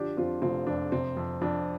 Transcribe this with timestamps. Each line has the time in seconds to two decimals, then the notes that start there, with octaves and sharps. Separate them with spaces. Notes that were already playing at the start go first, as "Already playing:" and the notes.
Already playing: D3 F3 D4 G4
0.17 F2 C4 F4
0.42 F1 C4 F4
0.67 F2 D4
0.92 C3 C4
1.17 F2
1.41 F2 D4